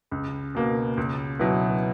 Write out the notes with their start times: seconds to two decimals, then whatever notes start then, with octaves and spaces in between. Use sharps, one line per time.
0.11 C#2
0.55 B2 A#3
0.97 C#2
1.39 B2 F#3 B3 E4